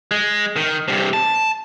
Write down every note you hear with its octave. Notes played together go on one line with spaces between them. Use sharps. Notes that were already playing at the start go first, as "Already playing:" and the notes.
G#3
D#3
G2 C3
A5